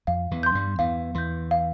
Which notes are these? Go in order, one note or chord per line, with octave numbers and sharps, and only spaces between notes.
F2 F5
E2 E3
C6 G6
G2 G3
E2 E3 F5
E2 E3 C6 G6
F5